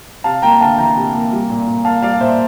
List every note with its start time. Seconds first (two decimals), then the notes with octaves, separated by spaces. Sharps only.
0.24 C3 F5 A5
0.42 A#3 G5 A#5
0.60 D2 F5 A5
0.78 E3 G5 A#5
0.96 C3
1.14 A#3
1.32 G3
1.49 A#2
1.67 A#2
1.85 A#3 F5 A5
2.02 G3 D5 F5
2.20 A#2 C5 E5